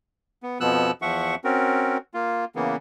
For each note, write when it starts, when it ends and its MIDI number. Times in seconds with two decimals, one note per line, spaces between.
0.43 0.58 59
0.60 0.91 41
0.60 0.91 47
0.60 0.91 53
0.60 0.91 59
0.60 0.91 88
0.60 0.91 90
1.02 1.35 40
1.02 1.35 53
1.02 1.35 76
1.02 1.35 78
1.02 1.35 85
1.44 1.97 60
1.44 1.97 61
1.44 1.97 66
1.44 1.97 70
2.14 2.45 58
2.14 2.45 65
2.56 2.76 49
2.56 2.76 52
2.56 2.76 58
2.56 2.76 59